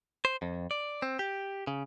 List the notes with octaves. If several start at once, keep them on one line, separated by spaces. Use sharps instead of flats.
C5
F2
D5
C4
G4
C#3